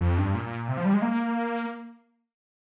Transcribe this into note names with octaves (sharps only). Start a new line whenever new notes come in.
F2
G2
A#2
C3
F3
G3
G#3
A#3